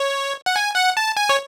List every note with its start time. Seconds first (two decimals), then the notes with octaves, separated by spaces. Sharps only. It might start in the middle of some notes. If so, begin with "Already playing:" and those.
Already playing: C#5
0.46 F#5
0.56 G#5
0.76 F#5
0.97 A5
1.17 G#5
1.29 C#5